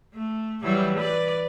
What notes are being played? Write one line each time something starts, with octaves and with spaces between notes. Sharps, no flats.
A3
E3 F#3 G3
B4 D5